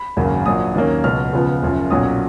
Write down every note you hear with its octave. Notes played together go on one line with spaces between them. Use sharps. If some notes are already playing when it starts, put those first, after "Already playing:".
Already playing: B5
G#1 F#2 C#3 F#3 A#3
A#1 A#2 F#3 D#6
D#2 D#3 F#3 A#3 C#4
C#2 B2 F#3 F6
C#2 C#3 F3 B3
F#1 F#2 F3
B1 A#2 F#3 C#4 D#6